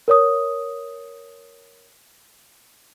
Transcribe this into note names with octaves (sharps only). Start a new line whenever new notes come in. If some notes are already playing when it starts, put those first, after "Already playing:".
A#4 C#5 D#6